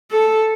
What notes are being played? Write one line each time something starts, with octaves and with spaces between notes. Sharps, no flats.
A4